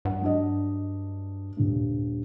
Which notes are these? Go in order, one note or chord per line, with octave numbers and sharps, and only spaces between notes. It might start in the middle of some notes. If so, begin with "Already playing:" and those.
G2 F#5
F#3 D4 D#5
D#1 G2